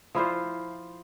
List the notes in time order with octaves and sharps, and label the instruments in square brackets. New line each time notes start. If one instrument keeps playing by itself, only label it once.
[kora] F3 E4 F4 C5